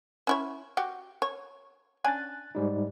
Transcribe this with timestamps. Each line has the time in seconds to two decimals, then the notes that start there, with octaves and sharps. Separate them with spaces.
0.27 C#4 E4 C#5
0.77 F#4 G4
1.22 C#5
2.04 C#4 D4 G#5 F#6 A6
2.55 G#2 G3 D#4